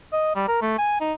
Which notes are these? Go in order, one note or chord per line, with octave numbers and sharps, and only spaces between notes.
D#5
G3
A#4
A3
G#5
D#4